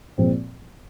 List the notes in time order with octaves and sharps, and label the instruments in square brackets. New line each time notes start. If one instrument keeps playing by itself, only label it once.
[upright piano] A#2 F3 G#3 C4